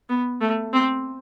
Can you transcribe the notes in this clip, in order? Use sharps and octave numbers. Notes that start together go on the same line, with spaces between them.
B3
A3
C4